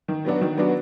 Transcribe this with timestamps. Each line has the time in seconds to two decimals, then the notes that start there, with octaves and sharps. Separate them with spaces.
0.08 D#3
0.25 F#3 B3 D4 F#4
0.41 D#3
0.58 F#3 B3 D4 F#4